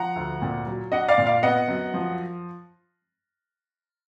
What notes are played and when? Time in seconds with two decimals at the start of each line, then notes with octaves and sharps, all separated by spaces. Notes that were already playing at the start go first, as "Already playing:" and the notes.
Already playing: F3 F#5 A#5
0.16 D2
0.42 A#2
0.67 F#3
0.92 D4 D#5 F#5
1.08 D5 F5
1.18 A#2
1.26 D5 F5
1.43 B3 D#5 F#5
1.68 F#2
1.94 F3